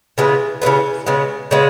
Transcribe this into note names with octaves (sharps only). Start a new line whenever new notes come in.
C#3 E3 G#3 B3
C#3 E3 G#3 B3
C#3 G#3 B3
C#3 G#3 B3